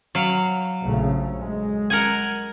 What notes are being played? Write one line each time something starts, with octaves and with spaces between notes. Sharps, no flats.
F#3 F5
A#1 C#3 A3
G#3
A#4 F#5 G#5